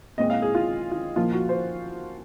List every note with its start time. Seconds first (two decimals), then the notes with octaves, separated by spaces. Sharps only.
0.18 A#2 G#3 C4 D#5
0.30 F5
0.42 G#4
0.55 F4
0.91 F4
1.16 A#2 F3 A#3 F4
1.33 F#4
1.49 C5